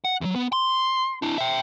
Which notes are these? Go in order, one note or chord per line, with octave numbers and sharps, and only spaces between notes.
F#5
E2 F#3
B3
C6
D4 E4
E5 G5